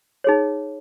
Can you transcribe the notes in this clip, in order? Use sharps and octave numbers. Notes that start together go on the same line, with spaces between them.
D#4 G#4 C#5